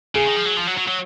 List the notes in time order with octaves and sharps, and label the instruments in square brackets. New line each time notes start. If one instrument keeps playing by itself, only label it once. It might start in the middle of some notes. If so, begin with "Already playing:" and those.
[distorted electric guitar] C#3 [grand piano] G#4
[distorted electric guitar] D#3
F3
F#3
F3
F#3
F#3
F#3